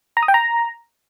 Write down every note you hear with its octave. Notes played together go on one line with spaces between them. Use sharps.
A#5
D#6
G5
A#5